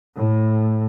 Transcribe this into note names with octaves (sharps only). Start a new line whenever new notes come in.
A2